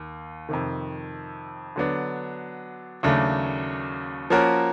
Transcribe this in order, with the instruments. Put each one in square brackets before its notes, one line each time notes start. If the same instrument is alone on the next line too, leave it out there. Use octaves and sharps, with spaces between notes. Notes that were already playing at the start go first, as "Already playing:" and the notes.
Already playing: [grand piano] D#2
F2 C3 D#3
D3 F#3 B3 D4
D#2 C#3 F#3 A3 D4
F3 A#3 C#4 F#4 A#4